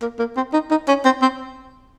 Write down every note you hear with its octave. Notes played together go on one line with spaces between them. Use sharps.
A#3
A#3
C4
D#4
D#4
C#4
C4
C4